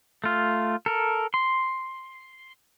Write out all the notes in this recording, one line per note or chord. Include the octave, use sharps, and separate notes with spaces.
A3 F4
A4 A#4
C6